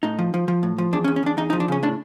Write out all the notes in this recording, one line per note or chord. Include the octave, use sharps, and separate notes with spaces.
A2 D#4
F3
F3
F3
A2
F3
E2 D4
C#4
E2
C#4
E2 D4
E2 D#4
D#4
F3
D4
C#3 C#4
A2 D4